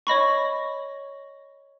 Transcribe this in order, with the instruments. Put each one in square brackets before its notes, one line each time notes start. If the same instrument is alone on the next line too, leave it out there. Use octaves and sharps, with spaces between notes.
[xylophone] C#5 D#5 B5 C#6